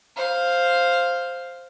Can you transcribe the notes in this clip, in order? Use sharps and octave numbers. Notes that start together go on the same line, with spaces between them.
C5 F5